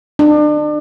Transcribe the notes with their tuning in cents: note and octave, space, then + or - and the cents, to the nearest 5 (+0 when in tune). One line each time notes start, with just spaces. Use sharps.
D4 +35